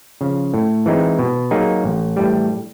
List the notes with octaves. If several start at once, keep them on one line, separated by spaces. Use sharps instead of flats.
C#3 F3
A2
E3 G#3 C4 D#4
B2
F#3 A#3 D#4 G#4
A1
A2 E3 G3